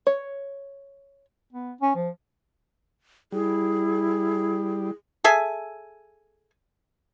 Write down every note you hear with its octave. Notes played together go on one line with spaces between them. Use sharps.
C#5
B3
C#4
F3
G3 E4 G#4
G#4 A4 E5 G#5